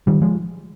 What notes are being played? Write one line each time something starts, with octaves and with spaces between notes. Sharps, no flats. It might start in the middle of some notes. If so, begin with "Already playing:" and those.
D#3 G3
F3 G#3